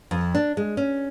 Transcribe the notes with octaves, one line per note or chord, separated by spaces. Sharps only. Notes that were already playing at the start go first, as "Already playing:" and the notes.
F2
D4
G#3
C#4